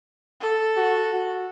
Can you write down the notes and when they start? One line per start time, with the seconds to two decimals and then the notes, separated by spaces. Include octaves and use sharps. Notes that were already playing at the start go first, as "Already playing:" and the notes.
0.41 A4
0.77 F#4
1.14 F#4